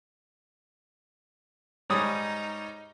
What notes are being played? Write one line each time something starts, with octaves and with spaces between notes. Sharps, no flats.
G#2 G3 D#4 C#5 D#6